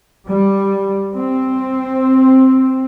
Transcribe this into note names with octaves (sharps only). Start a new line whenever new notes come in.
G3
C4